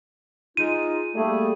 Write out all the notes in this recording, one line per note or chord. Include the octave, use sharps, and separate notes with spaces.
G#3 D#4 F4 D#7
G3 A3 A#3 G#4